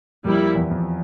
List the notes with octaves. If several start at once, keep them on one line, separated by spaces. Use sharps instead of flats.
F2 G3 A#3 E4
E2
F2